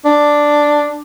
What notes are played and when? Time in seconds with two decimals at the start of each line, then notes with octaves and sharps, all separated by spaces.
0.05 D4